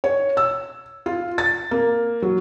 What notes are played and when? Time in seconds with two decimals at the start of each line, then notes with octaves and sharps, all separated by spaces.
0.04 C#5
0.37 E6
1.06 F4
1.38 A6
1.71 A#3
2.22 F#3